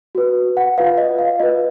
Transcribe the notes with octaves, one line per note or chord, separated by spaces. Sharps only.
F#4 B4
F#5
F4 B4 F5
D#5
F5
F4 B4 D#5